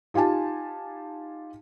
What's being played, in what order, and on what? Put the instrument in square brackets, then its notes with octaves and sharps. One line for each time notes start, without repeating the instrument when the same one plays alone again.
[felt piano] D#4 F4 G4 G#5 A5